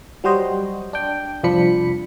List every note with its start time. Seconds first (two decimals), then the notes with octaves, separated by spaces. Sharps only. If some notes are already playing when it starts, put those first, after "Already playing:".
0.24 F#3 G3 F#4 C5 D#5
0.93 D4 G5
1.43 C2 F2 F3 D4 B5 C#7